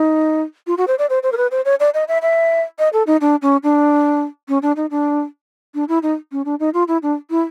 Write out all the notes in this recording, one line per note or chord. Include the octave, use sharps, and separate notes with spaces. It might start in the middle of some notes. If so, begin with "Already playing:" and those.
Already playing: D#4
F4
F#4
C5
D5
C5
C5
A#4
B4
C5
C#5
D5
D#5
E5
E5
D#5
A4
D#4
D4
C#4
D4
C#4
D4
D#4
D4
D4
E4
D#4
C#4
D4
D#4
F4
E4
D4
E4